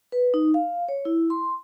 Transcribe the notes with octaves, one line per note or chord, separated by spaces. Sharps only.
B4
D#4
F5
C#5
E4
C6